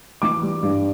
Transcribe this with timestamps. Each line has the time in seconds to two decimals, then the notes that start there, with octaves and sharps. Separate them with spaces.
0.22 E3 D6
0.42 G3
0.63 G2